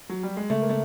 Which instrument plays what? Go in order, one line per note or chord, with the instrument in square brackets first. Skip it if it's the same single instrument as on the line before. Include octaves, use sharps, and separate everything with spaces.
[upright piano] F#3
G3
G#3
[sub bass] C#3 [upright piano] A3
[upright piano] A#3
A3